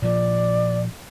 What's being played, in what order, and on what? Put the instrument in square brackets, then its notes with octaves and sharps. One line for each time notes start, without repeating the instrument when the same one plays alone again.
[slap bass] A#2 F3 [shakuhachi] D5